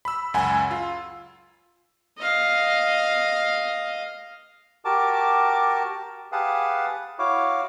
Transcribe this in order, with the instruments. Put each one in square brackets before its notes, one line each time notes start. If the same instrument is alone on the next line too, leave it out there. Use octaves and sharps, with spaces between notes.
[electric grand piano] B5 E6
C#2 F#2 F#5 G#5 B5
F4
[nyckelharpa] D#5 F5
[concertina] F#4 G4 A#4 A5 D6
G4 G#4 B4 F5 F#5 A5
E4 F#4 C#5 F5 D6